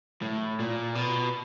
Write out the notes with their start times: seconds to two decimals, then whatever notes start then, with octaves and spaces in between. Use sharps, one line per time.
0.22 A2
0.60 A#2
0.95 B2